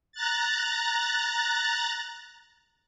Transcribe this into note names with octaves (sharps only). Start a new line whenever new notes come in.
A#5 F#6 A6